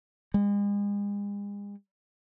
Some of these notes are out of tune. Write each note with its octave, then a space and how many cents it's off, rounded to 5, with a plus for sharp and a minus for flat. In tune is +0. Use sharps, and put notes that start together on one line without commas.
G#3 -40